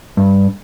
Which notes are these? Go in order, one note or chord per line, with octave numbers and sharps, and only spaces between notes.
G2